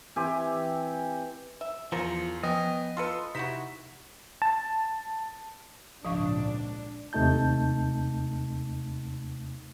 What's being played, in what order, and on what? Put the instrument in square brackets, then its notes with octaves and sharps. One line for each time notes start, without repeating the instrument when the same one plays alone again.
[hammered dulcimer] E3 C4 G4 G#5
[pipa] E5
[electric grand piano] E2 [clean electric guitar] F3 [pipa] F4 A#4 C5 [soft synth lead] C#7
[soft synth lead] F3 [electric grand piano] B3 G5 [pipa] C#4 [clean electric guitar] D#5
[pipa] F4 A4 B4 [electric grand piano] C6 E6 C#7
[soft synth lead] C3 [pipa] D#4 E4 F#4 [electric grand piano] B6 E7
[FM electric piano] A5
[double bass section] G#1 C#2 A#2 [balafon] F3 F5 C#6 [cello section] D4
[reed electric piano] D#2 C3 A3 D#4 A5 G6